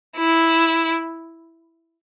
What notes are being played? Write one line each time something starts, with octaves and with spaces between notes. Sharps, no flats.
E4